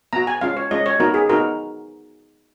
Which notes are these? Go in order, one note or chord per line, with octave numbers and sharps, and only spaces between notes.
B3 F#4 A#5
G#5
G#3 C#4 F4 F5
C#5
G#3 C#4 F4 D#5
C#5
B3 D#4 F#4 A#4
G#4
B3 D#4 F#4 A#4